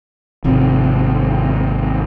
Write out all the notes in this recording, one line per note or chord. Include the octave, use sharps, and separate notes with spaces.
G#1 C3 F3